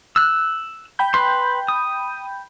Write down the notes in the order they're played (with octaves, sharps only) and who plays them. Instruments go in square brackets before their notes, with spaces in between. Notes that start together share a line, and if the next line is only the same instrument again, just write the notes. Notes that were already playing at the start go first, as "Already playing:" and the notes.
[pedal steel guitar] E6 F#6
[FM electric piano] G5 B5 G6
[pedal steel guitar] B4 C6
D#6